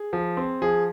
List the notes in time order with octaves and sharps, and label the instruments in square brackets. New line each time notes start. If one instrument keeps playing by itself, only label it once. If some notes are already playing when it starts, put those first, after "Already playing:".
Already playing: [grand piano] G#4
F3
C4
F3 G#4